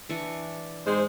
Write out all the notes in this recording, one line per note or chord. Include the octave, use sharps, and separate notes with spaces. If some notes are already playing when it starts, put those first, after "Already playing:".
E3 D4 C#6
G#2 G#3 C5